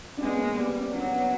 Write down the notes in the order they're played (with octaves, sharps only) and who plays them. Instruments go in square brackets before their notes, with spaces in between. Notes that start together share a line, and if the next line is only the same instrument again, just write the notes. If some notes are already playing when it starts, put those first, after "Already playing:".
[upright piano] D4
[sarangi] G#3 [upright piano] B3 C#4
[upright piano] A#3
B3
[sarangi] G3
[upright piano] C4
C#4
[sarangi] F#3 [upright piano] C4 D4
[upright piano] B3 C#4